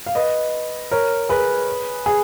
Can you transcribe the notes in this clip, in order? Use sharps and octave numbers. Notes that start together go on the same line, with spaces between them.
F5
B4 D#5
A#4 C#5
G#4 B4
G#4